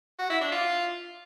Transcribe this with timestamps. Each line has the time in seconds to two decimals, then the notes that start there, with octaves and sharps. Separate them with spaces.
0.19 F#4
0.30 E4
0.41 D4
0.52 F4